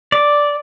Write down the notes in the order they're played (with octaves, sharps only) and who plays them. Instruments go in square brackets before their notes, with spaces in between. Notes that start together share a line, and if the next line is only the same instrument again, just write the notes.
[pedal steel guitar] D5